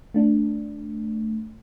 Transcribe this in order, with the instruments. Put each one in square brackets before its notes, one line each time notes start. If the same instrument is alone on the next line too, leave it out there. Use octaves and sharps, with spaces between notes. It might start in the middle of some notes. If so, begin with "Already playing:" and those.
[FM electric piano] A3 D4